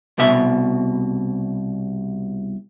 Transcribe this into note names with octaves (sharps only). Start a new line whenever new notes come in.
C2 B2 E5